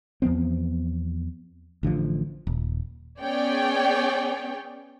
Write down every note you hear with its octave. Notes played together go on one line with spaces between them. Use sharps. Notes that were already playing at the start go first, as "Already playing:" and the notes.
E2 F3 B3 C4
A1 D3 E3 F3
D#1
B3 C#4 G#4 C#5 D5 G5